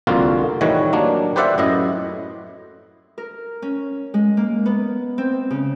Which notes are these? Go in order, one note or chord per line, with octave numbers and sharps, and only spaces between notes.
C2 F2 D3 A#3 F4 F#4
A2 D#3 E3 G3 C#5 F#5
F#3 A#3 D4
G4 B4 C5 D5 E5 F#5
F#2 A2 E4 D#5
A#4
C#4
G#3
A#3
B3
C4
C#3